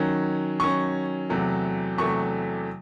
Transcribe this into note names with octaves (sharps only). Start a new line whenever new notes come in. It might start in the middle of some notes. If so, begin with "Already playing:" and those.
Already playing: D#3 F#3 C#4
D#3 F#3 C#4 C#6
E2 C3 F#3 A3
E2 C3 F#3 A3 C#6